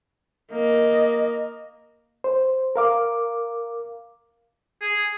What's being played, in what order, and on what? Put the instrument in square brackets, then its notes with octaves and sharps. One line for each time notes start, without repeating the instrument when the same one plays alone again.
[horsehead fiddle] A#3 D#5
[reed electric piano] C5
A#4 F5 D6
[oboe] G#4